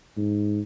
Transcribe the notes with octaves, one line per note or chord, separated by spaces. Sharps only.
G#2